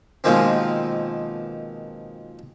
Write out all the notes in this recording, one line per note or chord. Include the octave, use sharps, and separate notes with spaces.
B2 D#3 F3 G#3 A#3 C4